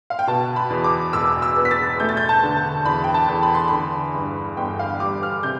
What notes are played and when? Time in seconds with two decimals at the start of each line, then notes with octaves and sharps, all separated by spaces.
0.10 F5
0.19 G5
0.27 B2 A5
0.56 B5
0.70 E2
0.84 D6
1.13 E1 E6
1.42 E6
1.56 B3
1.65 B6
1.71 A6
2.00 A3 G6
2.09 A6
2.17 G6
2.29 A5
2.43 D3
2.57 A5
2.85 E2 B5
3.04 G5
3.14 A5
3.28 E2
3.43 B5
3.54 C6
3.68 D3 B5
4.15 G2
4.57 G1 G5
4.79 F5
5.00 G3 D6
5.23 F6
5.43 C3 G6